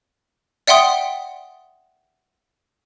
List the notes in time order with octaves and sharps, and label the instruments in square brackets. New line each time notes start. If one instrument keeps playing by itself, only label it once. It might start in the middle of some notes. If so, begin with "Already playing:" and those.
[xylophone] D5 E5 F#5 G5 C6 D#6